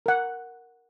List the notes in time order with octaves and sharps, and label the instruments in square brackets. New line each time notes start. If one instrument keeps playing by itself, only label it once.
[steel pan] A#4 F#5